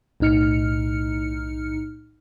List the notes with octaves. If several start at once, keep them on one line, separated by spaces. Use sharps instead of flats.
B1 A2 D#4 F6 C#7